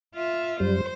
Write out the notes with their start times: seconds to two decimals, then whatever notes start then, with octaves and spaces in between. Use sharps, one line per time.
0.15 F4 E5
0.60 F#2 G3 C5